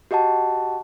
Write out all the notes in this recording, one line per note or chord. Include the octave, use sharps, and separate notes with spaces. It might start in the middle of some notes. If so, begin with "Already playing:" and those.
F#4 G4 D#5 F#5 A5